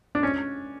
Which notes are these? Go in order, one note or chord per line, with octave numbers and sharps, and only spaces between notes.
D4
C#4